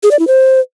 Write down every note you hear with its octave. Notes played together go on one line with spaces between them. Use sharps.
G#4
D5
E4
C5